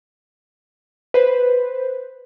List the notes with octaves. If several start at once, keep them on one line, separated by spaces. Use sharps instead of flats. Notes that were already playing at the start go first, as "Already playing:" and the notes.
B4 C5